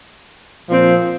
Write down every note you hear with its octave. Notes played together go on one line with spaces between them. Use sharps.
A#2 F3 C4